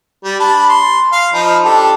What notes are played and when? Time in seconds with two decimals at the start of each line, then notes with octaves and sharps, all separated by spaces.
0.24 G3
0.39 D4 A5 B5
0.69 C6
1.12 F5
1.33 F3 D#4 B5
1.64 D4 G4 A4